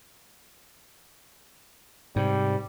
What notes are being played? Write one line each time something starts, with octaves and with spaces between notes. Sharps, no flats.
G#2 C3 G3